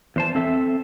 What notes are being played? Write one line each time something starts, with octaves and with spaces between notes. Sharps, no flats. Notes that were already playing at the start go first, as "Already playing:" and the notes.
E2 C5 A5
C4 A4 E5